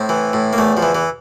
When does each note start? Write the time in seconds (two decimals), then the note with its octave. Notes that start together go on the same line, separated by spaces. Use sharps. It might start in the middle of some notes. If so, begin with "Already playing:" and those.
Already playing: A2 C4
0.09 E3
0.33 A2
0.53 A#3
0.58 E2 A3
0.77 F3
0.83 E3
0.95 E3